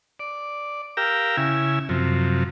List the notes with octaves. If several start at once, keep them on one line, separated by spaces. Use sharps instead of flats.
D5
G4 A#4 F5 G5 A#5 E6
C#3 E4 E5 G#5
F#2 C3 F3